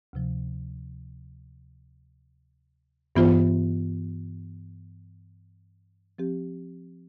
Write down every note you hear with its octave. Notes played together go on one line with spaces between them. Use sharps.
D2 C3 F3
G2 E3 B3 F4 C5
F3 C4 G4